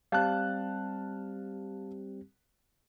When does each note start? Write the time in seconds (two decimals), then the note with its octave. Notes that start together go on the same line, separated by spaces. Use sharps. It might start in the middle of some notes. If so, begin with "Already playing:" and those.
0.12 G3 C4 G4 F5 A5 F#6